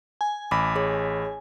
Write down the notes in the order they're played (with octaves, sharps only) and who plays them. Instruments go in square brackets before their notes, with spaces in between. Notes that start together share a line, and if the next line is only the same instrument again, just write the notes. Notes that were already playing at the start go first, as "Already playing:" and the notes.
[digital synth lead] G#5
[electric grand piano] A1 B5 [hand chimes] D6
[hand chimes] G#4 C#5